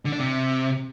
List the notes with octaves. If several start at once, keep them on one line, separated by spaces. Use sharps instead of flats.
D3
D4
C3